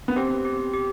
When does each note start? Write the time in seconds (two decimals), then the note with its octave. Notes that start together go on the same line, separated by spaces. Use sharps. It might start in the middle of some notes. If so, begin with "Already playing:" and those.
0.08 B3
0.16 C4 G4
0.45 G4
0.74 G4